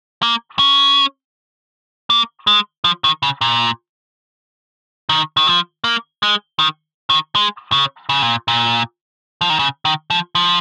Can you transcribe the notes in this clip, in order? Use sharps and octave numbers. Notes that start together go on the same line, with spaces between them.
A#3
C#4
A#3
G#3
F3
D#3
C#3
A#2
D#3
D#3
F3
A#3
G#3
D#3
D#3
G#3
C#3
C#3
A#2
A#2
F3
D#3
C#3
D#3
F3
F3